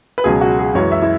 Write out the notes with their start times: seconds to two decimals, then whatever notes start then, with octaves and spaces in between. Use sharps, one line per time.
0.18 B4
0.24 C#2 B2 F#3 G#4
0.41 F#4
0.59 G#4
0.75 F#2 E3 G#3 C#5
0.92 E5
1.02 E4